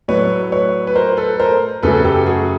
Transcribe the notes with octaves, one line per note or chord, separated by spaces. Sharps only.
A2 F#3 A3 B4 C#5
B4 C#5
B4
A#4 C5
A4 B4
A#4 C5
F#2 C#3 F#3 A3 A4 B4
G4 A4
F#4 G#4